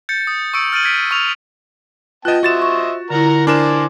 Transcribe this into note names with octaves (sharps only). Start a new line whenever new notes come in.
G6 A6 C#7
D#6
C#6 D#6 E6 C#7 D7
F6 A6 D7 D#7 F#7
G#6 B6 D7
C#6 E6 F6 F7
B3 F4 D#5 G5 A5 F#6
F#4 C5 D#5 E5 A6 E7
C#6
D3 E4 A#4 F#5 A#5
D4 A#4 C5 D5 G#5 E7